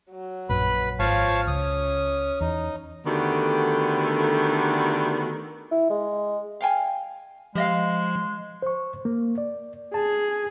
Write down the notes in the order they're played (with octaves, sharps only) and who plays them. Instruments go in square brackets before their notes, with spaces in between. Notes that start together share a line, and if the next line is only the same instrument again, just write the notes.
[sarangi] F#3
[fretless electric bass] A#1 F#2 [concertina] B4 B5
[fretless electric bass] G#1 [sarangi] F3 [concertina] C#5 F5 A5
[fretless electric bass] C#2 [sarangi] C#4 [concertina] D#6
[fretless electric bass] E2 [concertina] D#4
[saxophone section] D3 D#3 A3 B3 F#4 G4
[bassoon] E4
G#3
[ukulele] F5 G5 G#5
[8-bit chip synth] F3 [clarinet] G#3 [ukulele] G4 D#5 F5
[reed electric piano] C5 C#6
A#3
D5
[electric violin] G#4 [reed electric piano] A5